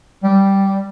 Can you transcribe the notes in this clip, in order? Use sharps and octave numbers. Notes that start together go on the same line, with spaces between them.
G3